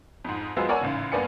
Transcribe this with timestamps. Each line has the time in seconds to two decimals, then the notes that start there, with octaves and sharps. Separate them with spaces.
0.24 F2 G#2
0.56 F2 F3 F#3 G#3 B3 E6
0.69 A#4 C#5 D5 F#5 G#5 A5
0.81 A1 G#2 C#3
1.12 G2 A#3 B3 D5 G#5 C#7